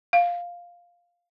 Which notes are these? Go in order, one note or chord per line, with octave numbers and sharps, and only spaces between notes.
F5